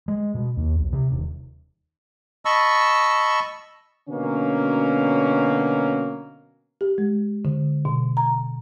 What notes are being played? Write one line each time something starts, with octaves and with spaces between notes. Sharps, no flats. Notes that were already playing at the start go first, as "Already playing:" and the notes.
G#3
B2
D#2
B1
C3
D#1
D#5 A5 B5 C#6 E6
B2 D3 F#3 A#3 C#4
G4
G#3
D3
B2
A#5